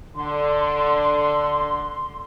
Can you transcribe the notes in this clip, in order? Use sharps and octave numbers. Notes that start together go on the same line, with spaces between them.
D3 C6